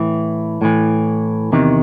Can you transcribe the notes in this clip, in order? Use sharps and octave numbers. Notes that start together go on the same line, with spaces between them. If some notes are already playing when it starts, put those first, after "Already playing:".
Already playing: A2 E3
A2 E3
E2 C3 D#3